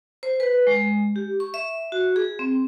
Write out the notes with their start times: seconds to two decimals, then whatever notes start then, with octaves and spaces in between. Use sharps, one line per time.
0.23 C5
0.40 B4
0.67 G#3
1.16 G4
1.40 C#6
1.54 E5
1.92 F#4
2.16 G#4
2.39 C4